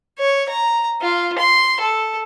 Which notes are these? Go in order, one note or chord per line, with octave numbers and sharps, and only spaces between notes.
C#5
A#5
F4
C6
A4